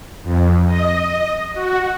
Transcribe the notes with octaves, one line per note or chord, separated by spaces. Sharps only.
F2
D#5
F#4